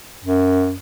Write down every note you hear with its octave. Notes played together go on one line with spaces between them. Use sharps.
F#2